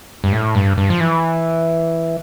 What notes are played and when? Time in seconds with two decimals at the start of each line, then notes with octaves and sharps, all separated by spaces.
0.24 G2
0.32 A2
0.55 G2
0.78 G2
0.90 F3
1.00 E3